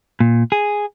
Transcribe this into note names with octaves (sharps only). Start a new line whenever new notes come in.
A#2
G#4